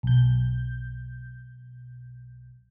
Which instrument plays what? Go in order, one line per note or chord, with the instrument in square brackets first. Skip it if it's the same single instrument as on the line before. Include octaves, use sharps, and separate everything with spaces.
[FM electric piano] B1 G6